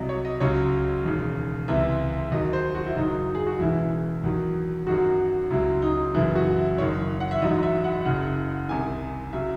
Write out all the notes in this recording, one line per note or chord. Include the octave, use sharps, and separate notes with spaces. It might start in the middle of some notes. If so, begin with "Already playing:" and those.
Already playing: C2 C3 F#3 D#5
C#5
D#5
C#2 C#3 F#3 C#5
E1 D#2 C#3
C#2 C3 E3 E5
D#2 D#3 F#3 D#5
C5
F#4
E4
F#1 F#2 D#3 F#3 D#4
G#4
F#4
E1 E2 C#3 E3 E4
E2 D#3 F#3
G#1 F#2 D#3 F#3 F#4
C#2 C#3 F#3 E4
D#4
F#1 F#2 E3 E4
F#4
E4
F#1 F#2 D#3 C#5
F#5
E5
A1 G#2 F#3 D#5
E5
E5
F#5
F#1 F#2 C#3 F#5
C2 C3 D#3 G#5
C#3 F#3 E5